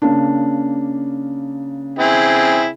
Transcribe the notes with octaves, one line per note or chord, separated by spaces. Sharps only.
C#3 A#3 D4
C4 E4 G#4